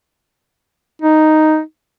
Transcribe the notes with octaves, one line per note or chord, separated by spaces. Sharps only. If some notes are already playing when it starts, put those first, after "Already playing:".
D#4